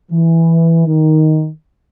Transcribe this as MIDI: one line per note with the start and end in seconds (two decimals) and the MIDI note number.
0.11 0.86 52
0.87 1.49 51